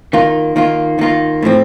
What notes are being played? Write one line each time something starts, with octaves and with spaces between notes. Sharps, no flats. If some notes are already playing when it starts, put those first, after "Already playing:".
D#3 A#3 F4
D#3 A#3 F4
D#3 A#3 F4
A2 F3 C4